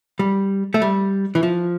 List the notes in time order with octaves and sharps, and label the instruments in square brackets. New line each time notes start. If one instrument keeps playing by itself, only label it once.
[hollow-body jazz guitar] G3
A3
G3
E3
F3